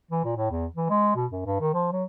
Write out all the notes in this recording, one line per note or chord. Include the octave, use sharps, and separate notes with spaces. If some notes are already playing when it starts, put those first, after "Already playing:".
E3
A#2
A2
E2
E3
G#3
B2
F#2
G2
D#3
F3
F#3